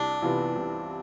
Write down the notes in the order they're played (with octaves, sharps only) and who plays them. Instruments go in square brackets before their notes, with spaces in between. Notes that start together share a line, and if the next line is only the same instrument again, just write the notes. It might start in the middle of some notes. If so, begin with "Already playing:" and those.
Already playing: [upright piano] C2 [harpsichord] D4
[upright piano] C3 E3 B3 F4
C2